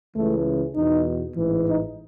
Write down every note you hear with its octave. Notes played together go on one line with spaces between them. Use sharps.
C#2 C#3 E3 A3
E2 B2 D#4
A1 G#2 E3
D#4